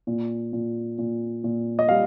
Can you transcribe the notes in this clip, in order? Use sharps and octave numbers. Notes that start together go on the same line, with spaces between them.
A#2
A#2
A#2
A#2
D#5
G3 F5